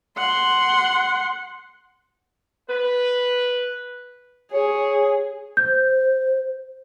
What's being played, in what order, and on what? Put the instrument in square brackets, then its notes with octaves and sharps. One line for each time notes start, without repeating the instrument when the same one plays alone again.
[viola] F#5 C6
[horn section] B4
[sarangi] G#4 [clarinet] C#5
[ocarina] C5 [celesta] G6